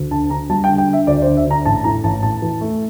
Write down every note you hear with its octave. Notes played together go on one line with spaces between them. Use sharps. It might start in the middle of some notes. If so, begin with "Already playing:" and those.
Already playing: D2
D3 A5
D3 A#5
G3 A5
G5
D3
G5
D4 E5
D2 D5
C5
D3
E5
D3 A#5
A1 A5
A2 A#5
A1 A5
A2 A5
E3
A3